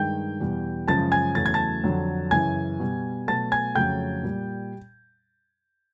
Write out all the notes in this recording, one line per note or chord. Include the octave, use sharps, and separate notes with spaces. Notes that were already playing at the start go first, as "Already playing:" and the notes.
Already playing: G2 D#3 G#3 G5 G6
E2 B2 G3
F#2 C#3 F3 G#3 A5 A6
G#5 G#6
E2 C#3 F#3 A3 A6
G#6
A5 A6
F2 D3 F#3
F#2 C#3 E3 G#5 G#6
B2 G3
B2 F#3 A3 A5 A6
G#5 G#6
F2 C#3 F#3 A3 G5 G6
A#2 G3